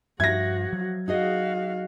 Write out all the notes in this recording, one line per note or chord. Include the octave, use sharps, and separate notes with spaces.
G2 F3 F#4 E5 G#6 A#6
F#3
D#4 F#4 G#4 D#5 F5